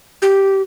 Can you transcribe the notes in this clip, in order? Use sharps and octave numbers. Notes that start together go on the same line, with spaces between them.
G4